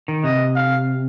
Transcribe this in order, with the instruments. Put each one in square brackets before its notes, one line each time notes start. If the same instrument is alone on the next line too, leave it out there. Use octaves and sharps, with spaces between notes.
[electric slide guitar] D#3
[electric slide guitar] C3 [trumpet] D#5
[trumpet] F5